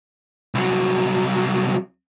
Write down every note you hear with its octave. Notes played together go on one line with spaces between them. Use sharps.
C2 F#3